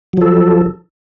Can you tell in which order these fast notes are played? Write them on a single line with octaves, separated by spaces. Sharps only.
F#3 F3 A4